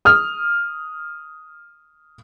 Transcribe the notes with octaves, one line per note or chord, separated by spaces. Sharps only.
D#6 F6